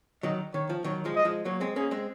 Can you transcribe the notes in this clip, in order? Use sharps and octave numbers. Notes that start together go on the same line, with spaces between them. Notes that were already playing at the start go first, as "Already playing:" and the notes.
D#3 F#3 D#5
D#3 C#5
F3
D#3 F#3 C#5
F3 G#3
D#5
F3 G#3
F#3 A#3 C#5
G#3 C4
A#3 C#4 G#4
G#3 C4